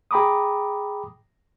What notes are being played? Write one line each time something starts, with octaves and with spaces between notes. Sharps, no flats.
G#4 G5 A#5 B5 D6 D#6